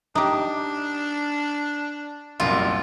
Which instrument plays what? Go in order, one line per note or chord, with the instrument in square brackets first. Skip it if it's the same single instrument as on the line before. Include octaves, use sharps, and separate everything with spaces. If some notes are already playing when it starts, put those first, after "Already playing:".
[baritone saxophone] D4 [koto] D#4 G4
[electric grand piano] C2 F#2 A#2 [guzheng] F4